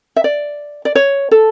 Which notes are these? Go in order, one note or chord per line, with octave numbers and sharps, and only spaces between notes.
E5
D5
D5
C#5
A4